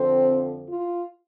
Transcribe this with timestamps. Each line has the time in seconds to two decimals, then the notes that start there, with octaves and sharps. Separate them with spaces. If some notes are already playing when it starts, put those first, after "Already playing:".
Already playing: F2 D3 F3 C4
0.67 F4